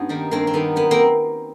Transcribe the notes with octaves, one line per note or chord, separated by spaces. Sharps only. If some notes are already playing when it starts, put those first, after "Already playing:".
Already playing: G2 B3 C#4 D#4
D#3 G3 A#3
G2 A#3 C4
C4
D#3 G3 A#3 B3
F#2 B3
A#3 C4